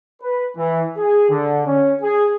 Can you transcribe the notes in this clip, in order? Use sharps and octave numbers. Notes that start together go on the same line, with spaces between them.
B4
E3
G#4
D3
C#4
G#4